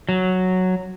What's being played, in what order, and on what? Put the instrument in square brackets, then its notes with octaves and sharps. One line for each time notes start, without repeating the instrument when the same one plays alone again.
[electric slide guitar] F#3